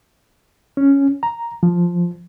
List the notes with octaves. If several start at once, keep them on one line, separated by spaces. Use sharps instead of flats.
C#4
A#5
F3